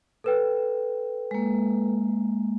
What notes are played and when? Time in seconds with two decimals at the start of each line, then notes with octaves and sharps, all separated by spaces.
0.24 A4 B4 G5
1.31 G#3 A#3